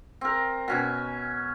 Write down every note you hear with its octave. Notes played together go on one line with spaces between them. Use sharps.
C4 A#4
B2 C#4 G#5